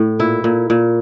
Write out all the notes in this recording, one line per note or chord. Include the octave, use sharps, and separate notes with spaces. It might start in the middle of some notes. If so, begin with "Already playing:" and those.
Already playing: A2
A#2 E4
A#2
A#2